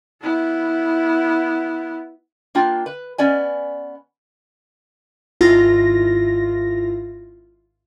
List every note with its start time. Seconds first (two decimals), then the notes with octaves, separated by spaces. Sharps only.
0.21 B3 E4
2.55 A#3 D4 F4 G5
2.86 B4
3.18 B3 C#4 D5 G#5
5.41 G#1 E4 F4 A#6